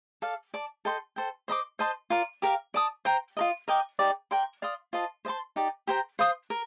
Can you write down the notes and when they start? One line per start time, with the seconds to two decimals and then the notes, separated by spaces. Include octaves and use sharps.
0.22 A4 D5 F5
0.54 D5 A5 D6
0.85 A4 D#5 G5 C6
1.16 A4 C5 G5
1.48 C5 D#5 A#5 D6
1.79 C5 D#5 A5 C6
2.10 F4 A#4 D5
2.42 G4 A#4 F5
2.74 D5 A5 D#6
3.05 C5 G5 A#5
3.37 F4 A#4 D#5
3.68 A#4 D#5 G5 D6
3.99 D#4 G4 D5
4.31 A#4 D5 G5 C6
4.62 D5 F5 C6 D#6
4.93 F4 C5 D#5 A5
5.25 C5 D#5 A5 C6
5.56 D#4 G4 D5
5.87 G4 C5 G5 A#5
6.19 C5 F5 C6 D#6
6.50 A#4